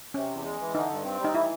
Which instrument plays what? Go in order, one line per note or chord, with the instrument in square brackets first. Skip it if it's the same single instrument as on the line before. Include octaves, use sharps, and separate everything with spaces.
[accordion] C3 [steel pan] C#4
[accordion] E2
G#3
E3
[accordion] D3 [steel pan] D#4
[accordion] G2
C4
G3
[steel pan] D#4
[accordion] E3 [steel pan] E4